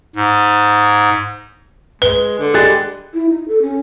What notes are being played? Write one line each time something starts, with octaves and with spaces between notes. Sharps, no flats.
G#2
G#3 B4 G7
D3
G3 G#3 F#6 A6
E4
D#4
A4
C#4